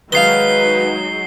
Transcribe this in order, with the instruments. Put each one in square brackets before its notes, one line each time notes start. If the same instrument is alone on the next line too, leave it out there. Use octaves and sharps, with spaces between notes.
[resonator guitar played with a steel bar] D#3 F5 [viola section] F#3 G#3 D#4 [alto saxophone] B4 [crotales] C7 G7